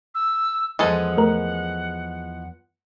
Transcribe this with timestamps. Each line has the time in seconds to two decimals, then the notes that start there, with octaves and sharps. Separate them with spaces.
0.14 E6
0.79 E2 F3 G#3 G#4 A4 F#5
1.18 A3 A#4